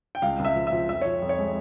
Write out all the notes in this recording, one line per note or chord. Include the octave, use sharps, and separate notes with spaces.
G5
C#2 F5
C#2
E5
F3
E5
F3
F2 E5
F3 C#5
F2
C#5
G#3